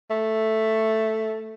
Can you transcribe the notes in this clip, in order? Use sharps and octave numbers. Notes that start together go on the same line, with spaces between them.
A3